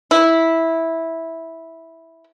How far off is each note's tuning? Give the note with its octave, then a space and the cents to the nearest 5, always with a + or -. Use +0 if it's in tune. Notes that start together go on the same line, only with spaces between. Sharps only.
E4 -10